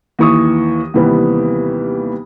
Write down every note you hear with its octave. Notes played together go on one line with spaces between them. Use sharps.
D#2 E3 C#6 D#6
D#2 C3 E3 G3 B3